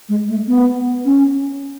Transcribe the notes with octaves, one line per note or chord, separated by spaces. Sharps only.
G#3
A3
B3
C#4